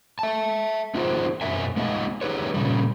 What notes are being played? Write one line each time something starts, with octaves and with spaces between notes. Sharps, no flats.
E5 A5
B3 D#4 F4 F#4 G#4 C5
F#2 B2 F#3 A#4 E5 G#5
G#3 B3 D#4 D#5 F5 G#5
D#4 G4 G#4 B4 C#5
A#2 C#3 G3